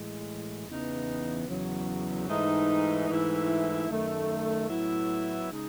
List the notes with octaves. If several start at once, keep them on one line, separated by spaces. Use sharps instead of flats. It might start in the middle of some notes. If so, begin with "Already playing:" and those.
Already playing: A2 E3 G#3
E2 C#3 E3 B3 D#4
E2 C#3 F#3
G#2 E3 A3 D#4
G#2 E3 A3 E4
F#2 D#3 A3
A2 F#3 B3 E4
C#3 G#3 D#4